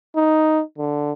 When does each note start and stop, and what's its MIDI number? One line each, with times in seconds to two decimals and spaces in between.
0.16 0.62 63
0.78 1.13 50